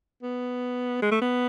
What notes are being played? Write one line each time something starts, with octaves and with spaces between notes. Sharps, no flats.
B3
G#3
A3
B3